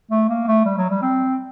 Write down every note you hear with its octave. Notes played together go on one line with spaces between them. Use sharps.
A3
A#3
A3
G3
F#3
G3
C4